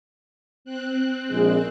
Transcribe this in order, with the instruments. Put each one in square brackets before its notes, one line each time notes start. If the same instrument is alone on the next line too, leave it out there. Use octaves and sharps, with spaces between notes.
[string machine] C4 F#6
[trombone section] A#1 G#3